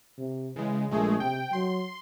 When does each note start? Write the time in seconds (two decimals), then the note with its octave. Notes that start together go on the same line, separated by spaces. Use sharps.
0.18 C3
0.56 C#3 E3 G#3
0.91 A#1 G#3 A3 G#4
1.20 C3 G5
1.53 F#3 C6